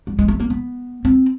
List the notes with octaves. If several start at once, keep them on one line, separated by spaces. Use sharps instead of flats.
G3
G#3
A3
A#3
B3
C4